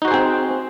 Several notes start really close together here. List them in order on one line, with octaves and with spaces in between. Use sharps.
D#4 F#4 C5 G#4 C4